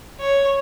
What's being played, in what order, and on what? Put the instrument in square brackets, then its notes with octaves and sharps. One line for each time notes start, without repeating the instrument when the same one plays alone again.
[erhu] C#5